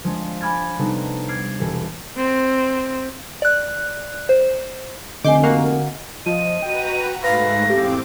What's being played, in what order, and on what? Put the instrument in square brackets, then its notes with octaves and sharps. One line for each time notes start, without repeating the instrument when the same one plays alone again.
[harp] F3 G#3 D4
G#5 B5 D6 F6 G#6 A6
C3 G3 B3 D4 D#4 A4
D6 F6 G#6 A6 C7 D7
E1 E3 G4 A4
[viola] C4
[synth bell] D5 F#6
C5
[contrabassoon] F1 [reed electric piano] D3 [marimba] D#5 G#5 [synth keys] D6 G6 C7
[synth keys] A#3 F#4 F5
[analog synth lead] F3 [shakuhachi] D#5 [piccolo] D#7
[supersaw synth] F#4 B4 A#5 [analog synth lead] G5
[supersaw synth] G#2 A3 [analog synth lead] B4 [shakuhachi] F5 [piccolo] A#6
[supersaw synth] E2 C4 D6 [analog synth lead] G4